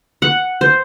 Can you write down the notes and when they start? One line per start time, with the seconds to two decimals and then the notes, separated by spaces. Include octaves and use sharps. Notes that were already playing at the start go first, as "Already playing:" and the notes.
0.22 F#5
0.61 C5